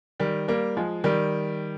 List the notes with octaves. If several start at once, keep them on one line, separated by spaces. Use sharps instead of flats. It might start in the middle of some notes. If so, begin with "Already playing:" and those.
D#3 G3
G3 A#3
F3 G#3
D#3 G3